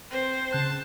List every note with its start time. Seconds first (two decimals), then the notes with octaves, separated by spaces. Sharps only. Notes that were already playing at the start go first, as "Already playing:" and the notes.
0.11 C4 C5
0.53 C#3 A5 F#6